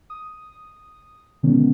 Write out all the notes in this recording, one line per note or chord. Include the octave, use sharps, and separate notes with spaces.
D#6
B2 D3 D#3 G#3 B3 C#4